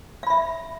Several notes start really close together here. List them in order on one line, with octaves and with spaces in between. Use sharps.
F5 B5 E5